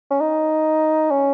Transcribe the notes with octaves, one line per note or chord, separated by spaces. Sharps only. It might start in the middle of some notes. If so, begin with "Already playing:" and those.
C#4
D#4
C#4